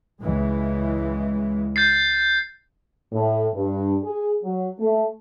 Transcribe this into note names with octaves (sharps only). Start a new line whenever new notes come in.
C#2 E3 G#3
G6 A6 C7
A2
G2
G#4
F#3
A3